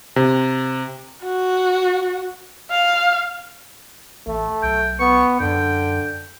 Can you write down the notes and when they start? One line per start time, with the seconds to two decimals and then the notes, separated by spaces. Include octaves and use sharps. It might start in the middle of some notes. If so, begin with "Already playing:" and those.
0.16 C3
1.23 F#4
2.71 F5
4.26 A1 A3
4.63 B1 G5
4.99 B3 C#6
5.40 F#2 D3 G5